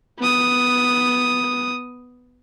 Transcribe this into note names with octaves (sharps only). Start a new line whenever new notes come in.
B3 D#6